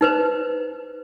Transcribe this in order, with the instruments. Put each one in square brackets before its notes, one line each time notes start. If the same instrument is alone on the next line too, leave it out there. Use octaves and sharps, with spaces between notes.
[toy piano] D#4 B4 C5